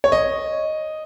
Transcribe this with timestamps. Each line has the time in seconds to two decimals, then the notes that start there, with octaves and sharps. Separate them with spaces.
0.04 C#5
0.12 D#5